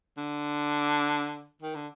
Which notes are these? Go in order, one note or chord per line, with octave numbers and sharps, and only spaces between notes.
D3
D#3
D3